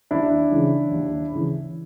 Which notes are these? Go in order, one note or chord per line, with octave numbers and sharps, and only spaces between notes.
D#2 D4 E4
C#3 E3
D#2
C#3 E3